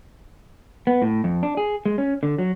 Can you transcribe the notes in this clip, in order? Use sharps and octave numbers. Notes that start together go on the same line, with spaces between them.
B3
A2
F2
D4
G#4
G#3
C#4
D3
F#3